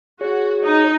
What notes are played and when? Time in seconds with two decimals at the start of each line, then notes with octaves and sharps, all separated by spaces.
0.21 F#4 G#4 C#5
0.64 D#4